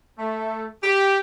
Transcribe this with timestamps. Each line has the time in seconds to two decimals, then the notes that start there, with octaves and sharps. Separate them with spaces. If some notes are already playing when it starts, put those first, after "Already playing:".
0.19 A3
0.83 G4